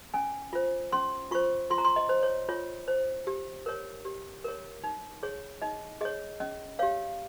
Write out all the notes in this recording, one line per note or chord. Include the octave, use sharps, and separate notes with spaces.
C#4 G#5
F4 C5
C#4 C6
F4 C5 C#6
F4 C6
A#5
C6
D#5
C5
C#5
F4 C#5
C5
G4
A#4 C#5
G4
A#4 C#5
D#4
G#4 C#5
D#4 D#5
G#4 C#5 D#5
C#4 D#5
G4 C#5 F5